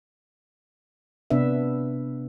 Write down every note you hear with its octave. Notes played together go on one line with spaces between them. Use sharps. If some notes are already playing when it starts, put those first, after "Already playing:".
C3 B3 D4 B4 E5